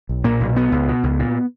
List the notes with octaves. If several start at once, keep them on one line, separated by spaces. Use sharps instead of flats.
B1
A#2 A#3
B1
B2 B3
C#2
B2
C#2
A#2